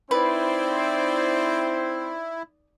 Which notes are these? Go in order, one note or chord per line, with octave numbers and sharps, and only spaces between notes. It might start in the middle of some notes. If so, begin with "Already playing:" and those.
C4 D#4 E4 B4 C5 D5